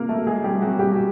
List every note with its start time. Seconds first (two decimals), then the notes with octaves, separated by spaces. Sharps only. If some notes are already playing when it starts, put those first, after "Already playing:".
Already playing: A#3 A#4
0.09 A3 A4
0.27 G#3 G#4
0.44 G3 G4
0.62 F#3 F#4
0.79 G3 G4